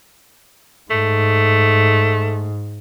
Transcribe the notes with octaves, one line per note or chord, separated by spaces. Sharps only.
G#2 A3